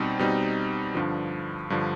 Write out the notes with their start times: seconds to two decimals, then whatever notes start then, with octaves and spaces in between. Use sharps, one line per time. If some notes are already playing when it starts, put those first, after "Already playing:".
Already playing: B2 G3 C4 D#4
0.19 B2 G3 C4 D#4
0.95 G2 D3 F3
1.70 G2 D3 F3